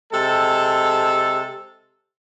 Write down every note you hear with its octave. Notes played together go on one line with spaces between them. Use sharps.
C3 G#3 A4